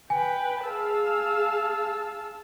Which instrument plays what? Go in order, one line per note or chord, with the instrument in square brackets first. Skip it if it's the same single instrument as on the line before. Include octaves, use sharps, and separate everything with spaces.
[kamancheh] B4 G5 [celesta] G#5
[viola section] G#4 F5 [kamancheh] A5 E6